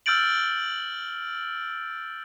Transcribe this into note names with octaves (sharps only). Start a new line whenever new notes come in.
E6 F6 G6 A6 D7 F#7